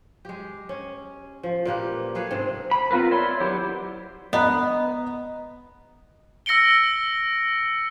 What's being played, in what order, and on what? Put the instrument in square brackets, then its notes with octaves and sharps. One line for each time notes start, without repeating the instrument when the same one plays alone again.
[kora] G#3 G4
C#4
F3
A#2 A#3 G4 B4
A3 G#4 B4 F5
G#2 C3 C4
[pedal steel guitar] B5
B3 C4 F4 A#4 B4
C#5 D5 E5 B5 C6
F#3 B3 E4 G4 C5
[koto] B3 [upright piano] D#5 A#5
[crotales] E6 A#6 C#7 D7 G7